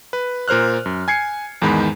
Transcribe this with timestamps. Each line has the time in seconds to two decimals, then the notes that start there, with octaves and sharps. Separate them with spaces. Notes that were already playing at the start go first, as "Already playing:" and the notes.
0.13 B4
0.48 A#2 A#4 C5 F6 F#6
0.86 F#2
1.08 G#5 G#6 C7 C#7
1.62 E2 G#2 D#3 G#3 B5